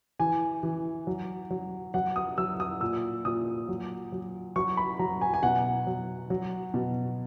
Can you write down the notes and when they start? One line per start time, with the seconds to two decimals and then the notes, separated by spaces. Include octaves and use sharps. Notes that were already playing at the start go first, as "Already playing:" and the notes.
0.20 E3 G#5
0.63 E3
1.07 F#3
1.50 F#3
1.94 F#3 F#5
2.16 D#6
2.38 F#3 E6
2.60 D#6
2.81 A#2 E6
3.25 A#2 D#6
3.68 F#3
4.12 F#3
4.56 F#3 C#6
4.77 B5
4.99 F#3 A#5
5.21 G#5
5.34 G#5
5.43 B2 F#5
5.87 F#3
6.30 F#3
6.74 B2